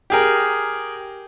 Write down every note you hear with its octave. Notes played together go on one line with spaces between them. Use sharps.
G4 G#4 A#4